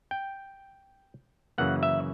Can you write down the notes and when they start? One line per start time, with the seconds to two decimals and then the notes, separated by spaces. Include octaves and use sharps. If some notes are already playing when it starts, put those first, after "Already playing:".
0.11 G5
1.58 F#2 C#3 E3 A#3 F#5
1.83 E5